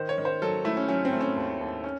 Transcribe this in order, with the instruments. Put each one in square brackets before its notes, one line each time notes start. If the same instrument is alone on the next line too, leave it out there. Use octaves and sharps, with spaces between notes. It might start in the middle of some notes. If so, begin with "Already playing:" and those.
Already playing: [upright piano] D#3 C5
C#5
D#3
C5
F#3 A4
A3 E4
C#4
F#3 C#4
C4
A3
C#4
D#2
D#2
C#4